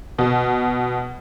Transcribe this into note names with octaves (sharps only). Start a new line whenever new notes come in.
B2